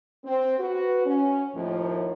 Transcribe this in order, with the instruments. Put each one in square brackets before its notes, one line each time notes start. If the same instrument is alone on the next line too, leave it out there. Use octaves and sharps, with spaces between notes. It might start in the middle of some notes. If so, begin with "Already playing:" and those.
[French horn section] C4
F#4 B4
C#4
D#2 A2 F3